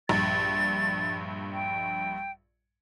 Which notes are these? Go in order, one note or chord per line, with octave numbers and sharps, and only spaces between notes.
A#1 G2 A6
G5